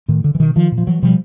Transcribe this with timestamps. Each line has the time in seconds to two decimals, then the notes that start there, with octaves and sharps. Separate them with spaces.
0.08 A2 D#3
0.24 D3
0.35 E3
0.40 B2 D#3
0.56 D#3 F3
0.72 A#2
0.78 F3
0.87 E3 F#3
1.02 B2 F3 G3